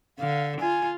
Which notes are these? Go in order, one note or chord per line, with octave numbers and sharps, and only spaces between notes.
D3 F5
F4 G#5